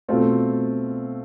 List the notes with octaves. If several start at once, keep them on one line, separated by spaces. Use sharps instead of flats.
B2 A3 C4 F4